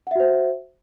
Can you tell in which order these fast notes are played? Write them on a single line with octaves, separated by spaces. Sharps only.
F#5 E5 F#4 C5